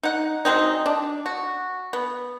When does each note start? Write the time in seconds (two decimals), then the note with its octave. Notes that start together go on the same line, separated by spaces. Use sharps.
0.03 D#4 F#5
0.45 F#3 G#3 C4 D#4
0.86 D4
1.26 F#4
1.93 B3